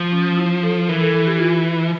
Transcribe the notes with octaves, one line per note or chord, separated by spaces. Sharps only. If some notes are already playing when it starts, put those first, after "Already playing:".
Already playing: F3
C#4
E4
A4
E3 A#4
A4
A4
G4
F4